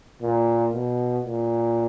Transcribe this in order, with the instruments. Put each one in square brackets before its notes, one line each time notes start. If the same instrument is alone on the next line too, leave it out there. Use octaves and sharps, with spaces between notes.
[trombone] A#2
B2
A#2